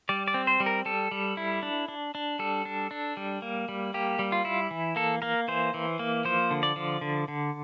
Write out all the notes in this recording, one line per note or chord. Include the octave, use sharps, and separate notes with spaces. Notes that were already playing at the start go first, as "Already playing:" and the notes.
G3 D5
D5
C4
C5
G3
A#4
G3 A4
G3
E4
D4
D4
D4
G3 A4
D4
D4
G3
A#3
G3
A#3 G4
G3
F4
E4
E3
A#3 A4
A#3 A#4
E3 C5
E3
A#3
F3 C5
D3
D5
F3
D3
D3